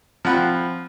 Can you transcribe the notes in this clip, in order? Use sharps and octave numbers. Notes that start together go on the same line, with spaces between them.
F3 C4 F#5 B5